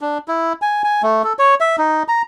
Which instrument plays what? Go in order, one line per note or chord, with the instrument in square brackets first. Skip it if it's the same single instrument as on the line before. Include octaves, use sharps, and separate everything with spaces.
[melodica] D4
E4
G#5
G#5
A3
A4
C#5
E5
D#4
A#5